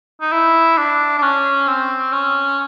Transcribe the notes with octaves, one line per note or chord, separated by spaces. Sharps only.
D#4
E4
D4
D4
C#4
C4
C#4